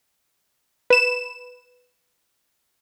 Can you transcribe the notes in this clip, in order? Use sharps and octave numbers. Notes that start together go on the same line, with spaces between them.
B4 E7